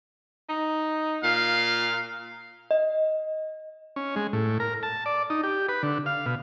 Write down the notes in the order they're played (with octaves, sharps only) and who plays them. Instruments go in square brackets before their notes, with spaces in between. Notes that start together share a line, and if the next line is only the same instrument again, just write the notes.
[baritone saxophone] D#4
[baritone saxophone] A#2 [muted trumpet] F5
[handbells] D#5
[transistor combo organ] C#4
G#3
A2
A#4
A5
D5
D#4
G4
B4
D3
F5
B2